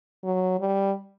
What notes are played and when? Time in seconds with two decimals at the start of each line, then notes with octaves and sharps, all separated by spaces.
0.24 F#3
0.60 G3